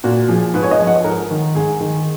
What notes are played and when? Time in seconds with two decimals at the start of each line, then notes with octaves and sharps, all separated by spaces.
0.04 A#2 F#4
0.28 F3 G#4
0.54 G#2 B4
0.63 C#5
0.71 D#5
0.79 F3
0.87 F#5
1.04 G#2 A#4
1.31 D#3
1.55 G#2 G#4
1.81 D#3